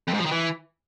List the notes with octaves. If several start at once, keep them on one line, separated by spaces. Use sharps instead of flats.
F2
G#2
F3
D#3
E3